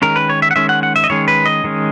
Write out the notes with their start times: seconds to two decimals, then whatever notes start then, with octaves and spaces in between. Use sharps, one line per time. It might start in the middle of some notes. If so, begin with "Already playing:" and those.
0.02 D#3 G#3 C#4 A#4
0.16 B4
0.30 C#5
0.42 E5
0.51 F#5
0.56 D#3 G#3 C#4 E5
0.69 F#5
0.83 F#5
0.96 E5
1.04 D#5
1.10 D#3 G#3 C#4 C#5
1.28 B4
1.46 D#5
1.64 D#3 G#3 C#4